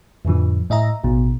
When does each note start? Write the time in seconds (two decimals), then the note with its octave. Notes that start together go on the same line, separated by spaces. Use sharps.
0.25 F2 A2 D3 F3
0.70 A2 D#5 E5 A#5
1.04 A1 B2